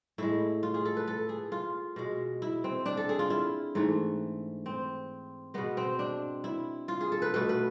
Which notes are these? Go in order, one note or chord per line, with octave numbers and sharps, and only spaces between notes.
A2 G#3 E4
F4
G#4
A4
B4
A4
G#4
F4
B2 G#3
E4
C4
D4
A4
G#4
F4
E4
G#2 E3 A3
C4
B2 G#3 B3
C4
D4
E4
F4
G#4
A4
B4
B2 A3 B4
B4